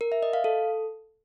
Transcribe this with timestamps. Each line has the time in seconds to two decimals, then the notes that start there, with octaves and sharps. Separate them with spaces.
0.01 A#4
0.12 E5
0.23 D#5
0.33 F5
0.44 A4